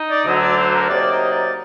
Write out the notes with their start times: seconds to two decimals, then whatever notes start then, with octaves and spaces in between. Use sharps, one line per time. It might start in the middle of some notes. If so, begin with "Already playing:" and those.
Already playing: D#4
0.10 D5
0.25 D2 D3 F#3 D#5
0.41 D5
0.57 C5
0.73 A#4
0.88 C3 F#3 A#3 D#4 D5
1.09 D#5
1.31 D5